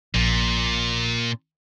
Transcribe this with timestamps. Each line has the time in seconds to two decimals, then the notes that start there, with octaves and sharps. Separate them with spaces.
0.14 A#1 A#2